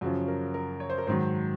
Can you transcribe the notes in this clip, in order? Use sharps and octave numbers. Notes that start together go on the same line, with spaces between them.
F#2 C#3 F3 F#4
A#4
A#4
C#5
C5
A#4
G#2 D#3 F#3 C5